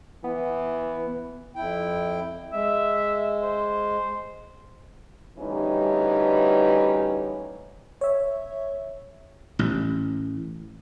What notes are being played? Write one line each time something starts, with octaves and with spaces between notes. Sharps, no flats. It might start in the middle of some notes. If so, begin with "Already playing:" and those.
E3 B3
F2 E4 G5
G#3 E5
C5
D2 E3 G3 C#4 D#4 B4
C#5 E5
A1